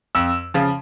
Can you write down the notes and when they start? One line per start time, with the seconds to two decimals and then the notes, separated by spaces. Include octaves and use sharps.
0.15 F2 E6
0.54 C#3 F3